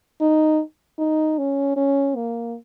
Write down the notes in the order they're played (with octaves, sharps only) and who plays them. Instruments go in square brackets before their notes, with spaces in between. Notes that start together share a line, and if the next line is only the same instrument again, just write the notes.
[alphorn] D#4
D#4
C#4
C#4
A#3